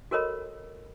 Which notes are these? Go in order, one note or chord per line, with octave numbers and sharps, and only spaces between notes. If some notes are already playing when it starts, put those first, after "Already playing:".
F#4 A4 A#4 C#5 D#5 B5